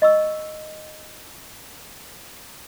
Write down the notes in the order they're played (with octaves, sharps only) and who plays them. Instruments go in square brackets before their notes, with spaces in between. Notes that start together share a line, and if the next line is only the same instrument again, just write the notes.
[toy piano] D#5 C#6 E6